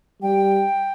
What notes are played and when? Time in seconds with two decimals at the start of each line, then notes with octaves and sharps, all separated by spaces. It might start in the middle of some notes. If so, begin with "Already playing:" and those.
0.22 G3 G5